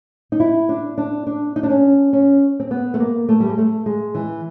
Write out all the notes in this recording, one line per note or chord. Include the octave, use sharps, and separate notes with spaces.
D#4
E4
D4
D4
D4
D#4
D4
C#4
C#4
C4
B3
A3
A#3
A3
G3
G#3
A3
G#3
E3